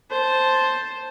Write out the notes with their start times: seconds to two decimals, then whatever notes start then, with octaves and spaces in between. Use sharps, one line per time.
0.10 C5 A5